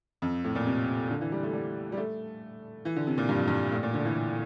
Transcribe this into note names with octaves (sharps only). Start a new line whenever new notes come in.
F2
A2
A#2
C3
C3
D3
E3
G3
A3
G3
G3
A3
E3
D3
C3
A#2
G2
F2
G2
A2
A#2
D3
E3